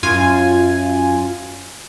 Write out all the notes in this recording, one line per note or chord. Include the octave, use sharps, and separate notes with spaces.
F#2 F4 G#5